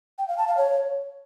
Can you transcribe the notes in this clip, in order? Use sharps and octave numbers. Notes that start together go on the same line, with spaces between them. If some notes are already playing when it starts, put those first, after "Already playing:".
G5
F5
A5
F5
C#5